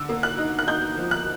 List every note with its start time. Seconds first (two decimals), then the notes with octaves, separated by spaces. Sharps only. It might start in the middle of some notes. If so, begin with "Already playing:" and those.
Already playing: D3 E6
0.09 A#3
0.23 F#6
0.38 D#4
0.59 F#6
0.67 D#4 G6
0.97 F3
1.11 F#6